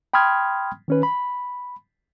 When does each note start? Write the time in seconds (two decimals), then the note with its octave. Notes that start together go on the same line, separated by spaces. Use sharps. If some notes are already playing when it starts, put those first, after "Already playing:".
0.13 G5 B5 C6 D#6 F6 G#6
0.88 D#3 C#4 B4
1.03 B5